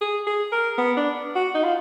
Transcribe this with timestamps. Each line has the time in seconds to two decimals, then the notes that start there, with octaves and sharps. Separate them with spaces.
0.01 G#4
0.26 G#4
0.52 A#4
0.78 B3
0.97 D4
1.35 F#4
1.55 D#4
1.64 F4